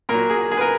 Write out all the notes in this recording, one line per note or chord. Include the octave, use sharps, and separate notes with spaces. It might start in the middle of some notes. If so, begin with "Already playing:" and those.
A#2 F#3 A#4
G#4
G#4
B4
A#4